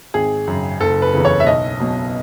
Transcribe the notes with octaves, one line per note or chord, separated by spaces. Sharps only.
G#1 G#4
F#2 C#3
F#1 A4
B4
E2 C#3
C#5
E5
B1 D#5
B2 F#3